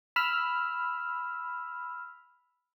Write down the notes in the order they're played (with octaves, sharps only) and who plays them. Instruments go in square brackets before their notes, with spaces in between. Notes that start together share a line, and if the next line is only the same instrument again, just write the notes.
[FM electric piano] B5 E6 F6